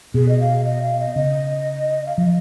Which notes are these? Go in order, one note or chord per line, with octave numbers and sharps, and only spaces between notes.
B2 G#4
D#5
F5
D#5
F5
D#5
C#3 D#5
F5
F3 D#5